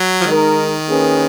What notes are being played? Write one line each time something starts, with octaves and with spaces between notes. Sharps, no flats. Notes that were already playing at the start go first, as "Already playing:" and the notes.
Already playing: F#3
F3
D#3 G#3 D#4 A#4
A#3 C#4 G#4 B4